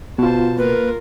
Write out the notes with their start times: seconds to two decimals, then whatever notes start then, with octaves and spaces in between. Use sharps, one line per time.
0.18 B2 B3 F4 C5 A5
0.58 A#3 F4 A#4 B4